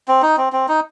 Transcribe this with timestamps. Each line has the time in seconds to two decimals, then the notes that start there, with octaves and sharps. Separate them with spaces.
0.08 C4
0.22 D#4
0.37 C4
0.53 C4
0.68 D#4